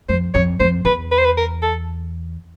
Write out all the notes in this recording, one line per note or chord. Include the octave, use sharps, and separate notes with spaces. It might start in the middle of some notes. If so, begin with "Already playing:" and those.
F2 C5
F2 C#5
F2 C5
E2 B4
B4
C5
B4
A#4
A4